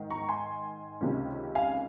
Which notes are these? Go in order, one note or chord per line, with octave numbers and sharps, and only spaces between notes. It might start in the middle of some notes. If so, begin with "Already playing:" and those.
Already playing: G#2 D#3
A#5 C#6
G#5 C6
C#2 C3 D#3 A#3 C#4
F5 G#5